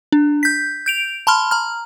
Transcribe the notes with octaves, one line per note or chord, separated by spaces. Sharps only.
D4
G6 B6
G6 D7 F7
A5 B5 C6 F6
A#5 F6